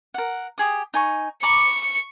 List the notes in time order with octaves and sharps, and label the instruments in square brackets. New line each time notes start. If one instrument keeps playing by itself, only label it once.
[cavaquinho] A#4 F#5
G4 G#4 D#6
D#4 G#5 C#6
[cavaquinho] A#5 B5 D6 [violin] C#6 C#7